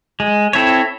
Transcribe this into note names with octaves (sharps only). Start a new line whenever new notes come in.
G#3
C4 E4 A4 C#5